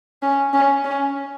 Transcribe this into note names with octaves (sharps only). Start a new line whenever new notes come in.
C#4
C#4
C#4